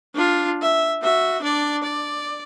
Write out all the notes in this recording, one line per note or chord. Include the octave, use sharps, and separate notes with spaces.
D4 F4
E5
F#4 E5
D4 D5
D5